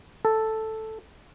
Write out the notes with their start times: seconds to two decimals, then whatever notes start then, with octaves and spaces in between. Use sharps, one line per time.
0.25 A4